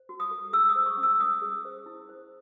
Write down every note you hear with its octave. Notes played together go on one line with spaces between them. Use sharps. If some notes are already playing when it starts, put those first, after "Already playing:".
Already playing: C5
F#4
D#6
A4
G#4 E6
D#6
C5
C#6
C#4
E6
C#4 D#6
G#4
C5
E4
C5